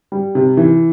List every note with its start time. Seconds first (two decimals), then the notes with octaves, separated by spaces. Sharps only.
0.12 G3
0.35 C3
0.57 E3